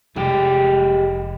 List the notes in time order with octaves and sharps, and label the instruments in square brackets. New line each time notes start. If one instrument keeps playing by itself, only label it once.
[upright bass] F1 [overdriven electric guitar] G#3 G4